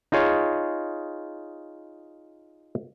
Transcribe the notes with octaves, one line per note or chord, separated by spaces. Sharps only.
D#4 F4 G#4 C#5